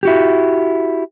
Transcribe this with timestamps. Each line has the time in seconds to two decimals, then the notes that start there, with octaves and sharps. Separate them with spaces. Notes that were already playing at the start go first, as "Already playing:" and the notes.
0.03 E4 F#4 G4